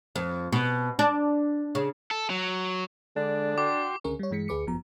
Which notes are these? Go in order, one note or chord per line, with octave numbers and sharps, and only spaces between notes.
F2
B2
D4
C#3
A4
F#3
D3 G#3 D4 D5
F#4 G5 C6 D6
C#2 D3 C#4 G#4 A#4 C#6
G3 C#5
G2 E3 G#3 B6 C#7
D2 G#4 B4 D6 C#7
G1 F#2 F3 B3 A#5